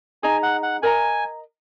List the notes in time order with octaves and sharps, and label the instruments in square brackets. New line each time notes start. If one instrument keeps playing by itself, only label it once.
[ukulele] D#4 G#4 D#5 A#5 [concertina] G#5
[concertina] F#5
F#5
[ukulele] A#4 D#5 A#5 [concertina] G#5